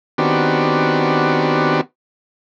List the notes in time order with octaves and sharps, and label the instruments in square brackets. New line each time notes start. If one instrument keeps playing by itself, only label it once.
[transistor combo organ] D#3 B3 C4 D4 F#4 G4